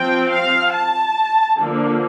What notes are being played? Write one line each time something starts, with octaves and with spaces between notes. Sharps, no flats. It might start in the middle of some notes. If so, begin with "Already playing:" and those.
Already playing: F3 C4 G5
F5
A5
D3 F3 A#3